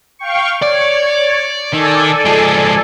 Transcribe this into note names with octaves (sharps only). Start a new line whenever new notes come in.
F5 G5 C#6
C#5 D5
D#3 A4 D5 G#5
F3 G#3